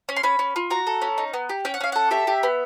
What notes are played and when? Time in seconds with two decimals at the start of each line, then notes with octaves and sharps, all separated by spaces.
0.09 C#4
0.16 C6
0.23 C#4 B5
0.39 C#4
0.56 F4
0.70 F#4 A#5
0.87 A4
1.02 C#4
1.18 D#4
1.33 B3
1.49 G4
1.65 C#4 G5
1.74 F#5
1.80 C#4 F5
1.92 A4 F#5
2.11 G4 E5
2.27 G4
2.43 B3